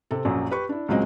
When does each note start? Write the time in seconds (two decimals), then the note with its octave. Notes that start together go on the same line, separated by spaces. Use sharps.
0.11 C3 C4 A4
0.25 A#1 F#2 F#3
0.50 G4 B4 C#6
0.69 D4 E4
0.88 C#2 A#2 F#3 G#3 C4 D#5